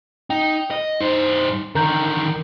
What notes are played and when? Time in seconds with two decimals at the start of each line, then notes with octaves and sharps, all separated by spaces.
0.30 D#4 G5
0.71 D#5
1.01 G2 D#4 C5
1.75 D3 D#3 A#4 A#5 G6